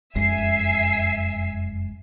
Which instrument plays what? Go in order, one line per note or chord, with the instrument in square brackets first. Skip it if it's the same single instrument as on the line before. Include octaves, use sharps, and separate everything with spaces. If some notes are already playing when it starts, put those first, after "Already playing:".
[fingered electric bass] F1 F#2 G#3 [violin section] E5 G#5 C7